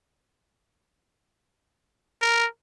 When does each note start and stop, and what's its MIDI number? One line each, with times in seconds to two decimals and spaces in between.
2.22 2.46 70